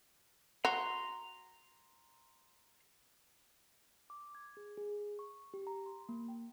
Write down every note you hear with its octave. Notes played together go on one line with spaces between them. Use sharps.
F#4 A#5 C6
D6
G#6
G#4
G#4
C#6
G4
A#5
C6
A#3
G5